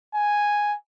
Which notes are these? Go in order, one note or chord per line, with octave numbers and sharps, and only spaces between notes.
G#5